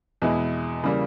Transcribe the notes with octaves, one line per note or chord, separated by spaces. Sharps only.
E2 B2 G#3 B3 E4
C#3 E3 G3 A#3